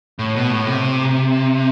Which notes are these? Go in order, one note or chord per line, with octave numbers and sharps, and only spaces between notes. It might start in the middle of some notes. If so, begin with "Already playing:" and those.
A2
B2
A2
C3